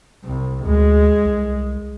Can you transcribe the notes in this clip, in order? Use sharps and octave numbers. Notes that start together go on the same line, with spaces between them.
C2
D2 G#3
C2